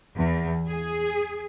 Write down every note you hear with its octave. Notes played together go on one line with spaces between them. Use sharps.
E2
G#4